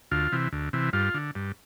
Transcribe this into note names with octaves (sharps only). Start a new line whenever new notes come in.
D2 F4
C3 E3
D2
C3 E3
G2 F4
D3
G2